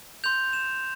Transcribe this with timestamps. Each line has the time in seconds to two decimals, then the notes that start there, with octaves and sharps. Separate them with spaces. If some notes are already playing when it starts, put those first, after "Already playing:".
0.24 C6 G6 F7
0.53 E7